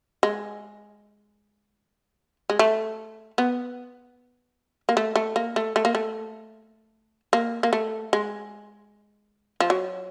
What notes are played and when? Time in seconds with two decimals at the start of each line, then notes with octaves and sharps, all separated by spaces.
0.23 G#3
2.50 G#3
2.59 A3
3.38 B3
4.89 A#3
4.97 A3
5.16 A3
5.36 A#3
5.56 A3
5.76 A3
5.85 A#3
5.95 A3
7.33 A#3
7.63 A#3
7.73 A3
8.13 G#3
9.60 F3
9.70 F#3